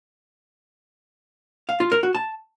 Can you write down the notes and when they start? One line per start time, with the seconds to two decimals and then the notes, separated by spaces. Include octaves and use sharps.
1.69 F5
1.80 F4
1.92 A#4
2.03 F#4
2.15 A5